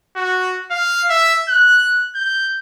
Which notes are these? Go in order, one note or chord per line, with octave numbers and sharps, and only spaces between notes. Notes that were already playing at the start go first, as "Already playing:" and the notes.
F#4
F5
E5
F#6
G6